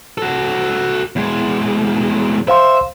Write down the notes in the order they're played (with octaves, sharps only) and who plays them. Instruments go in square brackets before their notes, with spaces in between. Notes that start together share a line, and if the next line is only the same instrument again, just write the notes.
[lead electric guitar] F#4 A4
E2 G#3
[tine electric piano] C5 F5 C6 [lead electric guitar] E5